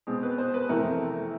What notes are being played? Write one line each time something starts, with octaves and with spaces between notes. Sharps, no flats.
B2 G#3 C4
B4
C5
B4
F2 C3 E3 A3 A#4